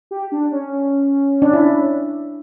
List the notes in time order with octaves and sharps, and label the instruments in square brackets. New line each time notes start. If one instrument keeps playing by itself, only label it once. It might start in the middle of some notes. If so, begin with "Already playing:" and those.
[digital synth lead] G4
D4
C#4
[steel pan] D4
E4